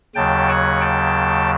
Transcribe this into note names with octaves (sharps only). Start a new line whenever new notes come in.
D#2 C#3 F#3 G5 A5
F#5 G#5
G5 A5